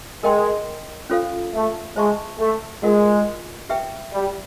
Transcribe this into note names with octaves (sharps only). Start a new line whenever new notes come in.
G#3 A#4 D#5 G5 C6
C#4 F4 A4 C5 F5
A3
G#3 C5 E5 A5 C#6
A3
G#3 F4 A#4 D#5 F#5
G4 B4 E5 G5
G3